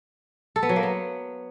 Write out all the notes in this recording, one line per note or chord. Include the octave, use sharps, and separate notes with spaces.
A4
B3
F#3
A#3
B3